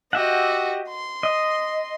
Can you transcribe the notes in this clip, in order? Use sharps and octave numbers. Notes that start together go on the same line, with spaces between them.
F#4 G4 D#5 E5 F#5
C6
D#5